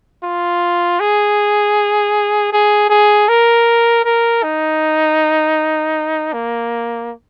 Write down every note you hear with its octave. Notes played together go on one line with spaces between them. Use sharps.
F4
G#4
G#4
G#4
A#4
A#4
D#4
A#3